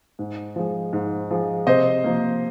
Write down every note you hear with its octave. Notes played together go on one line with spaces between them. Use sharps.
G#2
F3 G#3
G#2
F3 G#3
C3 C5 D#5
F3 A#3